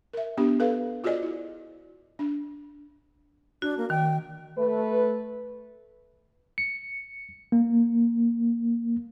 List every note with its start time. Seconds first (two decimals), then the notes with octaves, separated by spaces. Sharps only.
0.13 A#4 E5
0.37 B3 D4 G4
0.60 A4 B4 F5
1.04 F4 F#4 G#4 C5 D5 D#5
1.22 E4
2.19 D4
3.62 D4 F#4
3.77 A#3
3.90 D#3 G5
4.56 A3 B4
6.58 C#7
7.52 A#3